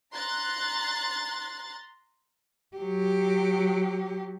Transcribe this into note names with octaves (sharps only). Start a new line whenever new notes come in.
A#5 C6 F#6 A6
F#3 G4